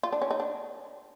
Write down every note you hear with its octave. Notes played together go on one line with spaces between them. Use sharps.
F4
D4
C#4
D#4
D4